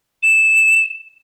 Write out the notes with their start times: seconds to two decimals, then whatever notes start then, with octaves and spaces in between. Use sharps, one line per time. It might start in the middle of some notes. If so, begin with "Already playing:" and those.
0.23 E7